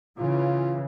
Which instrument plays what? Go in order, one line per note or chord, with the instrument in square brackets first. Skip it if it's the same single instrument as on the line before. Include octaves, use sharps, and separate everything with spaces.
[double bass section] C#3 E3 [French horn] F4